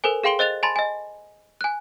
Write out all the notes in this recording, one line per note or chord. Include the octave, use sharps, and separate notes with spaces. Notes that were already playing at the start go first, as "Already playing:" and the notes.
A4 A#4 C5 G#5
G#4 F5 G5 C6 D7 G7
C5 D#5 F#6 A6 F7
G#5 A5 B5 C6 A6
D#5 G#5
G#5 F#6